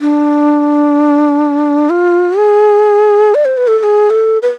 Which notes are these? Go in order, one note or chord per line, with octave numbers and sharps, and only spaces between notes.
D4
F4
G#4
D5
C5
B4
A4
A4
G#4
A4
B4